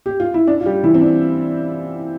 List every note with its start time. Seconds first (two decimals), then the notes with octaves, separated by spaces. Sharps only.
0.06 G4
0.20 F4
0.34 E4
0.47 D4
0.61 F4
0.66 G3 G4
0.83 E3 E4
0.94 C4
1.02 D4